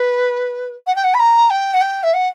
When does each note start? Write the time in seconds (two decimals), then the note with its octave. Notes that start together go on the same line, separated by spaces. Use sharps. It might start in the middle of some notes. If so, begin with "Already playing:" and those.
Already playing: B4
0.86 F#5
0.96 G5
1.04 F#5
1.14 B5
1.19 A#5
1.50 G5
1.73 F#5
1.81 G5
2.03 E5
2.13 F#5